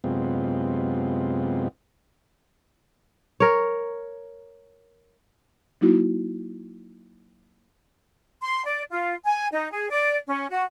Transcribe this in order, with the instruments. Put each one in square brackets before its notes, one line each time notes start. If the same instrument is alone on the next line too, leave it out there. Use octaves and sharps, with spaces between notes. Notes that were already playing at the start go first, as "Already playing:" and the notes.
[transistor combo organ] F#2 C3 G#3 B3 C4 F4
[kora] A#4 C#5
[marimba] F#3 A#3 D#4 E4 F#4
[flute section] C6
D5
F4
G#5
D#4
G#4
D5
C#4
F#4